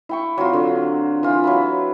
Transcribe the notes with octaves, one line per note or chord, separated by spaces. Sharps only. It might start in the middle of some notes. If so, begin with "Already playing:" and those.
E4 G5 C#6
F#3 C4 F4
D3
E3 F4
F#3 E4 B4